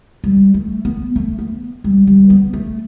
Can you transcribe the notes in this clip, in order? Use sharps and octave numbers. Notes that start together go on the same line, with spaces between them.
G3
A3
B3
A3
B3
G3
G3
B3
A3